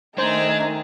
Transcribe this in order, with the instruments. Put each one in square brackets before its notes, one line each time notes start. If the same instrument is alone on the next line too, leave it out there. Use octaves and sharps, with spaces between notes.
[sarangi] D#3 [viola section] A3 G#5 A#5 [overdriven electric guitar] D4 [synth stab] C5